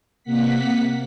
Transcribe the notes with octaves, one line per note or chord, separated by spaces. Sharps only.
C3 A#3 F#5 B6